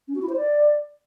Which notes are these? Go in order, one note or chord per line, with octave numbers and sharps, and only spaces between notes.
C#4
F#4
E4
C5
D5